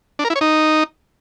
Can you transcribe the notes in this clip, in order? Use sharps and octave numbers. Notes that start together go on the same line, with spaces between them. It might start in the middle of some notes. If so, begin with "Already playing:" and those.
D4
A#4
E4
C#5
D#4